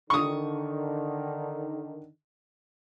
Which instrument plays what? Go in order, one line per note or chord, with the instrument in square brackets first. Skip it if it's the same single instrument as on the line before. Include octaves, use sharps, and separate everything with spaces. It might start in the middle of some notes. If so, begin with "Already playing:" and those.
[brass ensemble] D3 D#3 [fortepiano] C#6 D#6